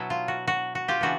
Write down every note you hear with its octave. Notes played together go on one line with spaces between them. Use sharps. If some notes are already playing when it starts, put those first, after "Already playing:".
Already playing: B2 F#3 B3 E4
F4
F#4
F#4
F#4
F4 G4
C#3 E3 B3 D4 F#4